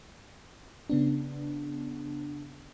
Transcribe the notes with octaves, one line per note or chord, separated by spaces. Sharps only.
C#3 B3 D4